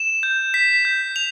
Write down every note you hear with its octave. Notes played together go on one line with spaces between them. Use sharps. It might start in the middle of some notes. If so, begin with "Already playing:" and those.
Already playing: E7
G6
B6
G6
F7